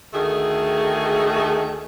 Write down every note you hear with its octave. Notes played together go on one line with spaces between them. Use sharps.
D2 D#3 A3 G#4